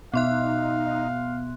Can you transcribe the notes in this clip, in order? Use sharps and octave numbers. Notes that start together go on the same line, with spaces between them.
B2 B3 D#4 E5 F5 C6 F#6